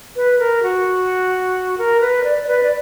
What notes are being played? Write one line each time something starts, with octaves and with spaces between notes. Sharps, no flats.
B4
A#4
F#4
A#4
B4
D5
B4
D5